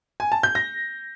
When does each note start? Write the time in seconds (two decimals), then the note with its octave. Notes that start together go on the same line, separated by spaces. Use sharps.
0.20 G#5
0.32 A5
0.43 G6
0.55 A#6